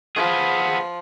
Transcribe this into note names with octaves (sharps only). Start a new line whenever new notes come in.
F3 B3 G#4